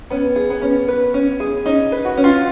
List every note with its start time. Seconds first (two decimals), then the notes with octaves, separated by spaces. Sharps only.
0.10 B3 C#4
0.36 G#4
0.50 B3
0.62 C#4
0.88 B4
1.14 C#4
1.40 G#4
1.66 C#4 D#4
1.92 B4
2.05 F#4
2.18 C#4
2.24 F4